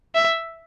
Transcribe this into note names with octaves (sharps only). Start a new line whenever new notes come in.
E5